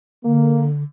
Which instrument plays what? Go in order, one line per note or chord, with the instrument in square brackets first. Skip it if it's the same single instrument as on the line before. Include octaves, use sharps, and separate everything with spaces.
[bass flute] D3 [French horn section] A#3